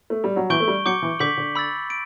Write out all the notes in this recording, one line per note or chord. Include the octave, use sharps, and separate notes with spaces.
A3
G3
F#3
E3 C#6 G6 D7 G7
A3
G3
F#3 D6 G6 C#7
E3
D3 D6 G6 B6 F#7
D3
B5 E6 A6
D7